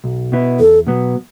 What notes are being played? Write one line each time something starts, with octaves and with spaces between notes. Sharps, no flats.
B1
B2 B3 E4
E2 A4
B2 F#3 B3